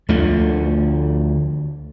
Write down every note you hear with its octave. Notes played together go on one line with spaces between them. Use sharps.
D2 D3 F3 A3